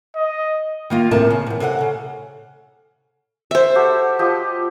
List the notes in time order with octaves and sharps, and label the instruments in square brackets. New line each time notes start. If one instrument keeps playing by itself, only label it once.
[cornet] D#5
[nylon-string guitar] D#3 A#3 F4
D2 A2 C3 A3 A#4 A5
C#3
E2 C3
C3 A4 E5 F#5
C#3
[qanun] C5 E5
[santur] F#4 G4 A4
F3 G4 D#5